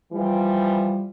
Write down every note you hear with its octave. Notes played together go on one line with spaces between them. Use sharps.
E3 F3 G3 F4